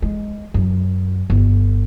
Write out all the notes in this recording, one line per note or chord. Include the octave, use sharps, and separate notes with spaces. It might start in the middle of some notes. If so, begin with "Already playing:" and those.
G#3
F#2
G1